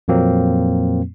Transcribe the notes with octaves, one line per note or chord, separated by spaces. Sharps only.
F2 A#2 F#3 A#3 C4